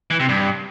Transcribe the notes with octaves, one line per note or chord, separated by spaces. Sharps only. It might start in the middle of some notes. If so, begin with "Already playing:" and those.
E3
C3
G2